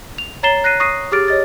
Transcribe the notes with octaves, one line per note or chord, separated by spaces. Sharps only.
F7
C#5 A#5 A6 C7 E7 G7
F#6 A#6 C7 D#7
C#6 D#6 A#6 C7 D#7
G4 G#4 D6 F6 A6 D7
C#5 D#5 A6